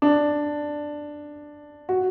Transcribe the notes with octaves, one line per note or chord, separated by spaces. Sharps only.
D4
F#4